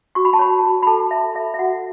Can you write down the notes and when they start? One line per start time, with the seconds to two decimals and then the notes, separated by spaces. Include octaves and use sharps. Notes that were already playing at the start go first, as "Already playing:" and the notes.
0.15 F#4 C#6
0.25 B5
0.33 A5
0.39 C#5 B5
0.63 F#4
0.83 B5
0.87 A4 A5
1.11 A4 E5
1.35 A4 E5
1.54 E5
1.59 F#4 F#5